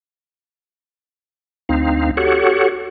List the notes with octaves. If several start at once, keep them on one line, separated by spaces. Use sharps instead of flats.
D2 C4 D#4 F5
F#4 G4 A4 C#5 F#5